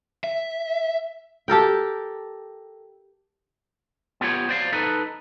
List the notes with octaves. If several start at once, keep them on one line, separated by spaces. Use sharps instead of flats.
E5
G4 A4 A#4 G5
B3 F4 G4 C#5
C5 D5 F5
D#4 A4 B4